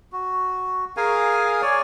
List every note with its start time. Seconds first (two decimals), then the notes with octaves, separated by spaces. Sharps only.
0.12 F#4
0.97 G#4 A#4 F5 G#5
1.62 C#5 D5 G#5